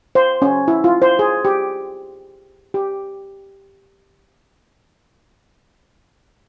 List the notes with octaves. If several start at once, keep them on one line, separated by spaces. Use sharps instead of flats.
C5
C#4
E4
F4
C5
G#4
G4
G4